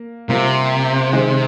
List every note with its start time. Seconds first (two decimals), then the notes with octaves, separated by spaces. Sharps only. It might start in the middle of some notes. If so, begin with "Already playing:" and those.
Already playing: A#3
0.28 C3 G3 A#3 F4 A#4
1.13 D#3 G#3 D#4 G#4 C5